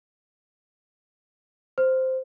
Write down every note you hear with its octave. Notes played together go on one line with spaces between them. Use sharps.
C5